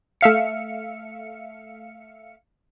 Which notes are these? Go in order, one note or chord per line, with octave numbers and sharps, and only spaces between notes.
A3 E5 F5 C#7